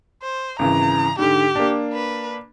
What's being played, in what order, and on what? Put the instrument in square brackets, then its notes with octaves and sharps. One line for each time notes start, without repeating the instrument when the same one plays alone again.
[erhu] C5
[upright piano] G#1 C#3 E3 [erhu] A#5
[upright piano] G#2 D3 [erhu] G4
[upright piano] A#3 D4
[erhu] B4